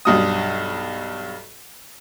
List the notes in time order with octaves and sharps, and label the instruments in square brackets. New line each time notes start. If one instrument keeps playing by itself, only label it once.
[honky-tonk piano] B1 G2 D#6